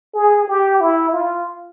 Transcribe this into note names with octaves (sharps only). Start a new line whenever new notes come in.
G#4
G4
E4
F4